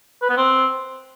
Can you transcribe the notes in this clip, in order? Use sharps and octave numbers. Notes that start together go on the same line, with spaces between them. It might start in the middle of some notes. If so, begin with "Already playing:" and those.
B4
B3
C4